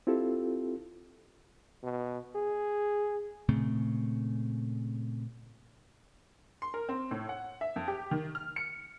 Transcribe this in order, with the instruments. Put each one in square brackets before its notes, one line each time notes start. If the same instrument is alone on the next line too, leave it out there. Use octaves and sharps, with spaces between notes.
[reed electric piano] C4 E4 F4 G4 A4
[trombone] B2
G#4
[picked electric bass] A#2 C#3 A3 C4
[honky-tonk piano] C6
A#4
C4
A2
F#5
E5
F2
G4
D#3
F6
C#7